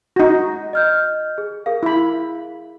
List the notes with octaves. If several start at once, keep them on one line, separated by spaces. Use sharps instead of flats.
D#4 F#4 A#6
D#5 F6 G6
G#4
G#4 A#4 F5
E4 B5